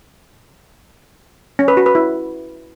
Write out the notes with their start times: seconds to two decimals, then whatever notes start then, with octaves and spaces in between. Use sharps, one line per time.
1.59 C#4
1.68 B4
1.77 F#4
1.86 B4
1.95 E4